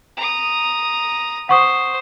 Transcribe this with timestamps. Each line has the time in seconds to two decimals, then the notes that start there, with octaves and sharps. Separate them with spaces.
0.16 A#5 D#6
1.49 C5 F#5 C#6 D#6